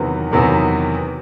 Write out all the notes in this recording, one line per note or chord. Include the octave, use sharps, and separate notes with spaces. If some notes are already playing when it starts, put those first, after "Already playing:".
Already playing: E2 C3 D#3 F#3 B3
E2 C3 D#3 F#3 B3